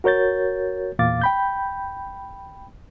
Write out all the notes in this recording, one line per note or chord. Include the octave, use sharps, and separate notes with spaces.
F#4 A#4 C#5 G6 A6
E2 A#2 F5 D6 A6
G5 B5 G6